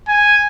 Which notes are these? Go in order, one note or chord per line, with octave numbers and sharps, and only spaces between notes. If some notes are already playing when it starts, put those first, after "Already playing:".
G#5